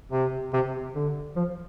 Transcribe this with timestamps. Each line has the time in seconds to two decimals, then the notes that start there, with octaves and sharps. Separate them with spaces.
0.12 C3
0.53 C3
0.95 D3
1.36 F3